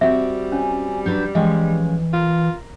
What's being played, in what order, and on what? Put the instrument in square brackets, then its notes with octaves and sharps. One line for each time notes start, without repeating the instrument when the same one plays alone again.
[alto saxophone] G3 [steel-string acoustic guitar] C4 F#4 [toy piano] E5 F#5
[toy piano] C#4 C#5 [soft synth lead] G#5
[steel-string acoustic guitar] F#3 D4 B4 [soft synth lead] G6
[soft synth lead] E3 [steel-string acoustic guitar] F3 G#3 C#4 [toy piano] D#5 G5
[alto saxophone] F4 [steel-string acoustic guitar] A#4